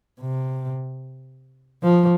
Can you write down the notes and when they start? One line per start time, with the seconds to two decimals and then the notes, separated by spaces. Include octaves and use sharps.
0.21 C3
1.83 F3